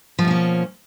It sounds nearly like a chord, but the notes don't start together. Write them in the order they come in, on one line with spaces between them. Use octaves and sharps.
F3 A3 B2 C#4 A#3